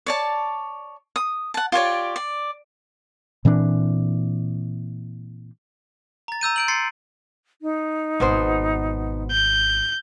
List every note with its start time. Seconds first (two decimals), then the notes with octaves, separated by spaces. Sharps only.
0.06 C#5 D5 A5
1.16 D#6
1.54 F#5 A5
1.72 F4 G4 C#5 D5
2.16 D5
3.45 A#2 E3 C4 D4
6.28 A#5 A6
6.41 A#5 E6 G6 D#7
6.56 G6 D7 F#7
6.68 C6 A6 C7 C#7
7.62 D#4
8.20 G#1 B2 B3 C5
9.31 G6